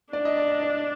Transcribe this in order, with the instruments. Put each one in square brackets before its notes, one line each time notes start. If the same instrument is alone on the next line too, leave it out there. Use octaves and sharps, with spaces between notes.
[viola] D4 [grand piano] D5
[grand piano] D#5
D5
D#5
D5